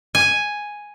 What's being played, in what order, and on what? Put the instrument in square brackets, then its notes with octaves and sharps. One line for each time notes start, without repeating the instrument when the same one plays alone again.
[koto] G#5